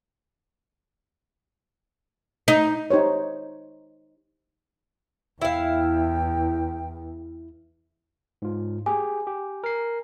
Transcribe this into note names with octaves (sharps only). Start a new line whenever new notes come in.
D#4
D#4 G4 C5 C#5
E2 E4 F5 G5
G#2 F4
G4 G#4 G#5
G4
A#4 C7